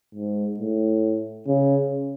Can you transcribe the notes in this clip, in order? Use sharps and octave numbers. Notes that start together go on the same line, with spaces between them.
G#2
A2
C#3